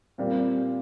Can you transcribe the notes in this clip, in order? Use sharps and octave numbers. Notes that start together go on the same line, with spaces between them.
A#2 G3 C4 F4